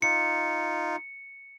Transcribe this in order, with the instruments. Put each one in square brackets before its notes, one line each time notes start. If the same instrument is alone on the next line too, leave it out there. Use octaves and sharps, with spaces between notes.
[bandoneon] D#4 F4 [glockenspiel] C#7